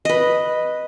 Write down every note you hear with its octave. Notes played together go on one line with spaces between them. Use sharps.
B4 D#5